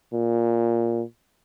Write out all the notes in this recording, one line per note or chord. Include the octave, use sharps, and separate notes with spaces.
A#2